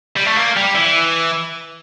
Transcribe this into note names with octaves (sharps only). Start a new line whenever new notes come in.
G3
A3
A#3
G3
E3